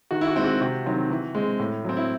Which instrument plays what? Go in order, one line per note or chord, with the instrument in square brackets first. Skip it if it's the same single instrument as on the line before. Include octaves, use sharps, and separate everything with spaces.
[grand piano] D#3 F#4
E4
F#4
G#3 C4 E4
F#4
C3 F#4
D#3 F#3 C4
E3
G#3 C4
A2
F#3 C4
E4